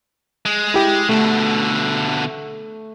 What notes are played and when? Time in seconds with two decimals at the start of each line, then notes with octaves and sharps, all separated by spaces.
0.46 G#3
0.74 E4 G4
1.09 B2 D3 A3